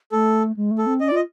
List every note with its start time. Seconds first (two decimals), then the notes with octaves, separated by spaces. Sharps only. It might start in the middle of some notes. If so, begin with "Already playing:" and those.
0.12 A3 A4
0.57 G#3
0.71 A3
0.78 A4
0.86 C4
1.00 C#4 D#5
1.08 D5
1.12 F4 D#5